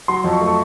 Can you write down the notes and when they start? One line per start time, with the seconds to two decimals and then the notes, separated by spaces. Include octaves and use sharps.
0.08 F#3 C6
0.24 F2
0.33 C#6
0.41 A3
0.48 C#6